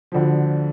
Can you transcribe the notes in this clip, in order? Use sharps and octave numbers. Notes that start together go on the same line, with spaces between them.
D2 D3 F3